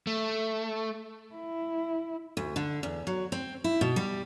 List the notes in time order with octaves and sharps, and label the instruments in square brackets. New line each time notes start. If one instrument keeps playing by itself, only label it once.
[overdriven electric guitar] A3
[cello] E4
[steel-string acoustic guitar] D2
D3
E2
F#3
C4
E4
B2
G3